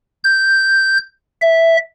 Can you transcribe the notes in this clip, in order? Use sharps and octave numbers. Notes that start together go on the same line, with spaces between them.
G6
E5